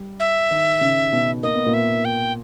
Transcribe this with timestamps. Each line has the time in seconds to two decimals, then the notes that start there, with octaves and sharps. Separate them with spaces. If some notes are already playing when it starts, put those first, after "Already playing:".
Already playing: G3
0.20 E5
0.51 D#3 D#4
0.81 C#3 C#4
1.12 B2 B3
1.43 A#3 D#5
1.54 B3
1.66 A#2 A#3
1.74 E5
2.05 G5